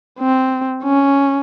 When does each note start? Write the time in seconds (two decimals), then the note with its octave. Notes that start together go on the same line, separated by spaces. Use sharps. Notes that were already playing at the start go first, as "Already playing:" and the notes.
0.20 C4
0.83 C#4